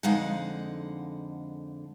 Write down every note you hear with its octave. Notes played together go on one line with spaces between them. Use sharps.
F2 D3 G#3 D#4 F5 F#5